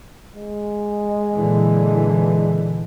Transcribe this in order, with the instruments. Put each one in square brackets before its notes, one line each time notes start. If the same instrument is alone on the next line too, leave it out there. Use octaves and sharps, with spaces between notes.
[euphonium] G#3
[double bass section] A#2 D3 E3